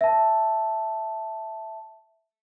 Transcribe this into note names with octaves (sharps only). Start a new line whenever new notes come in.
E5 A5